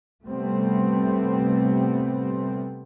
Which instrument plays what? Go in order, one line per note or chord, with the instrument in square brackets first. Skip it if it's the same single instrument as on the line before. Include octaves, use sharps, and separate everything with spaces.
[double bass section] C3 G3 A3 B3 C4